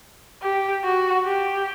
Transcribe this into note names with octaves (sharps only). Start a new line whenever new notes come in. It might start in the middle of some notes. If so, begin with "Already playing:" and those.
G4
F#4
G4